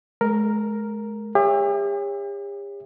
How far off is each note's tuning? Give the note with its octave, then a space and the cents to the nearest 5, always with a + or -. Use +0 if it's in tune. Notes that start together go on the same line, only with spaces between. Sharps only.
G#3 +35 A#4 +0
G4 +45 C#5 +0 E5 +0